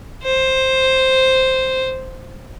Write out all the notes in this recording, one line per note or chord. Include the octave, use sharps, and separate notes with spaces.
C5